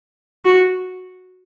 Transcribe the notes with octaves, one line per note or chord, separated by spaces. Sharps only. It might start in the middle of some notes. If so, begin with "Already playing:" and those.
F#4